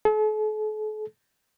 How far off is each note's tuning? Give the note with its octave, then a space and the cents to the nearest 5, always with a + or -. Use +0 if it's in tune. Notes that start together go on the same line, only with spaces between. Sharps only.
A4 -45